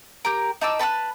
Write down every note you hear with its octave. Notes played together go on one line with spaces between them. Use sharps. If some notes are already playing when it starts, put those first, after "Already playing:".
G4 A#4
D#4 A5 D6 E6
B4 A5 C#6 F#6